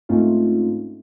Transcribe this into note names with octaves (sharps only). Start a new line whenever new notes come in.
G#2 A3 C4 C#4 D#4 F4